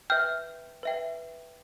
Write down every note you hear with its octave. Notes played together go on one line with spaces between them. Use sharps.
B4 E5 G5 F6 G6
B4 E5 G5